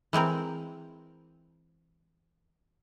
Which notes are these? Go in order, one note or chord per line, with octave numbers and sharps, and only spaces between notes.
E3 G#3 C4 A#4